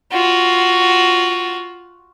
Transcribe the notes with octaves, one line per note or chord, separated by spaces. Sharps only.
F4 F#4